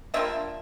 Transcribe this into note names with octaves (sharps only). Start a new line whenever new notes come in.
G3 A#3 D4 F4 E5